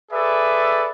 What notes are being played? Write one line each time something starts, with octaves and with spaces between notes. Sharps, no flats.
G#4 A4 B4 D5 E5